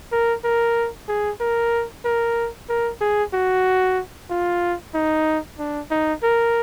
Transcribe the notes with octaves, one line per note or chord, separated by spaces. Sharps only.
A#4
A#4
G#4
A#4
A#4
A#4
G#4
F#4
F4
D#4
D4
D#4
A#4